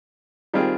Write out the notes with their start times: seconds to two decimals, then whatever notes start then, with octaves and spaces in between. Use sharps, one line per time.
0.54 D#3 G3 C4 F4 G#4